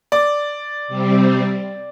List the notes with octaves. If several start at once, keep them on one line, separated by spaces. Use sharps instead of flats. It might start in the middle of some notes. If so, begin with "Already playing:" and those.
D5
C3 G3 C4